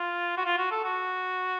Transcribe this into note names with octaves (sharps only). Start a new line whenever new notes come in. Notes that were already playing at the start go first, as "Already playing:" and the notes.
Already playing: F4
F#4
F4
F#4
A4
F#4